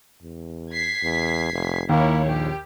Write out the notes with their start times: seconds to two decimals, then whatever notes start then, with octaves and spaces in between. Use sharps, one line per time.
0.22 E2
0.71 G#6 B6 C7
1.03 E2
1.53 F1
1.89 D#2 A#3 E4 C#5
2.26 A#1 G4